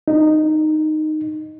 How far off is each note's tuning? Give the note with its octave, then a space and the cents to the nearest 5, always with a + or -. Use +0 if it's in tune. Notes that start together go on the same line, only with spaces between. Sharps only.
D#4 -10